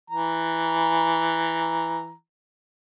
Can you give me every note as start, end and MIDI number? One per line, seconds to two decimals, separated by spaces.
0.10 2.13 52
0.10 2.13 82